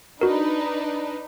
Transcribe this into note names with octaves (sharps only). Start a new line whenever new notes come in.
D4 D#4 F#4 A#4 B4